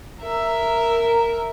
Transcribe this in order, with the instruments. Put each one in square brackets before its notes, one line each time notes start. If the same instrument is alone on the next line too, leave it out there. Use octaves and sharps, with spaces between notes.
[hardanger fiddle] A#4 E5